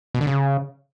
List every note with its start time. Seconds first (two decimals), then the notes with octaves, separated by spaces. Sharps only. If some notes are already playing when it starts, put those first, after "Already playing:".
0.15 B2
0.21 D3
0.27 C#3